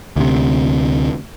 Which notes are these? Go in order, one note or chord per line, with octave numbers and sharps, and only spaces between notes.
D2 C3